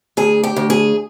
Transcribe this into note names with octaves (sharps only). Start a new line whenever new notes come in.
D2 G#4
G4
D2
G#4